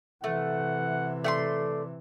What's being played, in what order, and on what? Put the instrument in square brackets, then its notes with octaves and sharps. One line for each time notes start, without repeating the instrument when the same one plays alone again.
[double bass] C3 E3 [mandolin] A3 [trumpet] F#5
[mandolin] A3 F#5 C6 [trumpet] D5